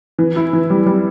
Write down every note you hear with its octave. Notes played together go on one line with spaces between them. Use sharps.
E3
E4
E3
G3
G3